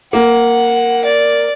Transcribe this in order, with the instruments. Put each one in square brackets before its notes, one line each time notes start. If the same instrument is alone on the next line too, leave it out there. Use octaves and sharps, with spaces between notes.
[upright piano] A#3 [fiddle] F#5
[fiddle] D5